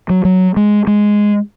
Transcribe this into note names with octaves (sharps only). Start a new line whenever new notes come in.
F#3
F#3
G#3
G#3